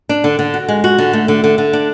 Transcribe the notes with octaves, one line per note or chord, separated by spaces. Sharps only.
D4
D3
D3
F#4
G#3
F#4
D3
A3
D3
D3
D3
D4